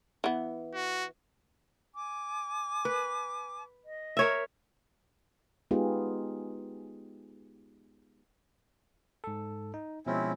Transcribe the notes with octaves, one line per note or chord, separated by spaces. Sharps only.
E3 B3
F#4
G#5 D6
B4
D#5
A#4 C#5 E5
G#3 B3 D#4 F4 G4 G#4
G#2 A4
D#4
B2 F3 G#3 C4 C#4 E4